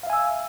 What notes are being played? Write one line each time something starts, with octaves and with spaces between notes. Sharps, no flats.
E5 F5 G#5 E6